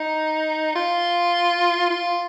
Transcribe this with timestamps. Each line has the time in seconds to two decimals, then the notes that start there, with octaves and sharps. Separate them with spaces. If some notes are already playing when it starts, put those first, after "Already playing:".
Already playing: D#4
0.76 F4
1.90 F4